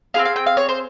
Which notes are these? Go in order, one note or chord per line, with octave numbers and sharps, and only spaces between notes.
C4 F4 G#4 F5
F5
G5
F5
C#5
C5